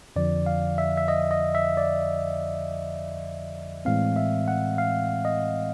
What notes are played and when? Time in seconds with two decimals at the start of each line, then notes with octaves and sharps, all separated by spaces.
0.16 F2 D3 F3 D5
0.46 F5
0.78 E5
0.97 E5
1.08 D#5
1.31 D#5
1.55 E5
1.77 D5
3.85 A2 E3 G#3 C4 F5
4.16 E5
4.48 F#5
4.78 F5
5.25 D#5